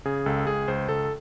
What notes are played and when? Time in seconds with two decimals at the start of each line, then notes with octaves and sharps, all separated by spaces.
0.05 C#3 G#4
0.26 C#2 A4
0.47 C#2 G#4
0.68 C#2 C5
0.89 C#2 A4